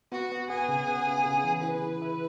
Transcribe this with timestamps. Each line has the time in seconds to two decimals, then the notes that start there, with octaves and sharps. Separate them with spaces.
0.12 B3 F#4
0.32 B3
0.50 B3 G#4
0.69 C#3
0.88 B3
1.07 C#3
1.25 C#3
1.44 E3
1.63 E4 B4
1.82 G#4
2.02 E4